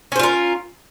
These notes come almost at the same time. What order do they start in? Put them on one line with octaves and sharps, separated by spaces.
C#4 C5 F4 A#4